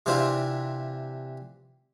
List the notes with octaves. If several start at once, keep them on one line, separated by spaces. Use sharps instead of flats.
C3 E3 C4 D4 E4 F4